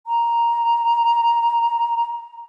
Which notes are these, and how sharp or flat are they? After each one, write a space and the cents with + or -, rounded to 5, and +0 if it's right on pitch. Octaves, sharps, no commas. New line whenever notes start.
A#5 +5